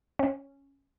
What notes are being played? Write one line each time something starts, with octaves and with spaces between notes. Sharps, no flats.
C#4